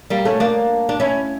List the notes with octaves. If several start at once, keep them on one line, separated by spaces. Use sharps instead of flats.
G3 A#3
A3 C#4
A#3 D4
D4
C#4 E4